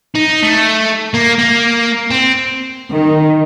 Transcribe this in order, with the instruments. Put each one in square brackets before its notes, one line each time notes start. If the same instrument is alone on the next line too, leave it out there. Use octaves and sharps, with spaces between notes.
[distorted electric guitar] D#4
A3
A#3
A#3
C4
[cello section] D#3